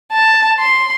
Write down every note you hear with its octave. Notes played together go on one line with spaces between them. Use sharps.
A5
C6